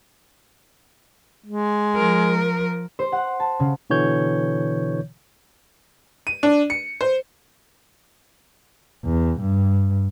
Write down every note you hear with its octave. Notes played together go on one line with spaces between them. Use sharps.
G#3
F3 A#4
C5
F#5
A5
C#3
B2 D3 E3 C#5 G6
D#7
D4
C#7
C5
E2
G2